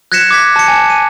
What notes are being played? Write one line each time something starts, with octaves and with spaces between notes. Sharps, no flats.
F#6 G#6 A#6 B6 C#7 E7
D6 G#6 B6
A5 C#7
G#5 E7
D#7